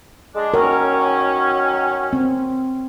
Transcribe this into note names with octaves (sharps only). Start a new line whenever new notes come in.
G#3 D4
D#3 F#3 C#4 A#4
C4